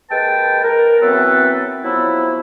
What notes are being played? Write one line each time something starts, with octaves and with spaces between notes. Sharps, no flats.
D#2 G#3 B4 G5 A5
A#4
E3 F#3 B3 C4 A4 B4
F3 F#3 B3 E4